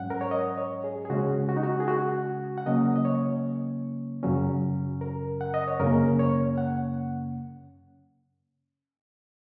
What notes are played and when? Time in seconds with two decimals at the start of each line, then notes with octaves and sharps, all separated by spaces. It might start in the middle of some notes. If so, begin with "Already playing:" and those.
Already playing: G#2 F#3 C#4 F#5
0.10 A#4
0.21 C#5
0.31 D#5
0.57 C#5
0.84 G#4
1.05 G#4
1.10 C#3 G#3 C#4 F#4
1.49 F#4
1.56 D#4
1.63 F#4
1.80 G#4
1.88 F#4
2.58 F#5
2.66 C#3 F#3 A#3 C#4 D#5
2.96 D#5
3.05 C#5
4.23 F#2 C#3 F#3 C#4
5.01 A#4
5.41 F#5
5.54 D#5
5.67 C#5
5.80 F#2 C#3 A#3 C#4 A#4
6.19 C#5
6.58 F#5